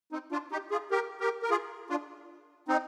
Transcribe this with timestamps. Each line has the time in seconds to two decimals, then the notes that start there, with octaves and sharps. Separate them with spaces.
0.12 C4 D#4
0.32 D4 F4
0.51 D#4 G4
0.71 F4 G#4
0.91 G4 A#4
1.20 G4 A#4
1.42 A#4
1.50 F4 G#4
1.90 D4 F4
2.68 C4 D#4